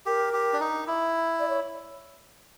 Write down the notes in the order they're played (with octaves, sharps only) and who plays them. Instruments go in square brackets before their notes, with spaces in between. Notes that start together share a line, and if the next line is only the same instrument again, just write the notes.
[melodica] G4 [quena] A#4
[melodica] G4
D4
D#4
E4
[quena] D5
C#5